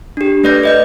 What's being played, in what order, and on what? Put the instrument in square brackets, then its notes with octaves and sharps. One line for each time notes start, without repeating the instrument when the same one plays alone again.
[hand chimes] D4 G4
A3 B4 D5 G6 A#6
B4 D#5 G6